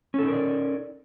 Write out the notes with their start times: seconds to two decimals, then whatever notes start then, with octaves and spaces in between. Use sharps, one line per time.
0.14 C#4
0.19 A4
0.23 D#4
0.28 A#4
0.32 D5